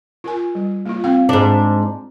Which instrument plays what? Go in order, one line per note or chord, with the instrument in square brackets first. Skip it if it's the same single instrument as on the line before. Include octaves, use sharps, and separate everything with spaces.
[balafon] F4 A#4 G#5
G3
A#3 F4
C4 F5 G5
[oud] G#2 D4